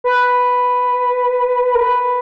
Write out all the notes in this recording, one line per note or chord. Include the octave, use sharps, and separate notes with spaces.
B4
A#4
B4